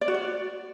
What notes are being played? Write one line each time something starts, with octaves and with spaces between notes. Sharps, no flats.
D5
F#4
D5